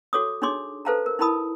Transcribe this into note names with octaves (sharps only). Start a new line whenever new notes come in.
F#4 A4 C#5 D6 D#6
D4 D#4 G#4 C#5 C6 D6
A4 B4 C5 F5 A5 A#5
A#4
D#4 E4 A#4 A5 B5 D#6